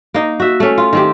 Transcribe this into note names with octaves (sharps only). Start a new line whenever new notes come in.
A#3 D#4
F#4 E5
A3 C#4
F4
D#3 C4 G4